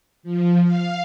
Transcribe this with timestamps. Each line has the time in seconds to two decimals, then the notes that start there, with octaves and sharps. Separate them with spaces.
0.23 F3
0.62 F5